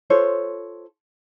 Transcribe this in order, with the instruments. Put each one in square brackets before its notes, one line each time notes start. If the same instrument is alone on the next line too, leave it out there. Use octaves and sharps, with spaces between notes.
[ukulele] F4 A4 C5 C#5